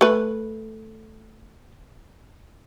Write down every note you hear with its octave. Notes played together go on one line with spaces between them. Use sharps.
A3 B4